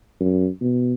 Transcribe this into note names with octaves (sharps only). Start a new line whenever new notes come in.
F#2
B2